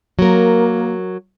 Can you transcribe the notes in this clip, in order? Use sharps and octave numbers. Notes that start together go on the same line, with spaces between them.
F#3 A#3 A#4